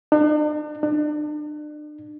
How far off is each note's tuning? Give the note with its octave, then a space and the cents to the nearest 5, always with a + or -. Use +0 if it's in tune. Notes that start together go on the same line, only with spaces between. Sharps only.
D4 +45
D4 +35